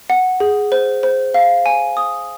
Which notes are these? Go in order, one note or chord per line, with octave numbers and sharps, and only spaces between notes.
F#5
G#4
C5
C5
F5
G#5
D#6